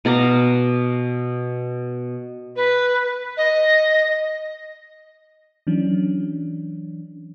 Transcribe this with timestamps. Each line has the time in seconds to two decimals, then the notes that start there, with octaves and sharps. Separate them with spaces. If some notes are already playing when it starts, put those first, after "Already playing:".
0.05 B2 F5 A#5 D6
2.56 B4
3.37 D#5
5.67 E3 F#3 C#4 D4